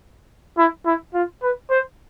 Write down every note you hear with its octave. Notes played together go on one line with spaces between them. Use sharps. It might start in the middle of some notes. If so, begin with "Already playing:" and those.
E4
E4
F4
B4
C5